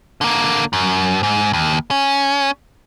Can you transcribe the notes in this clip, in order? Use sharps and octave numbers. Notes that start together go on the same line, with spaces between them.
D3 A#3
F#2
G#2
D#2
C#4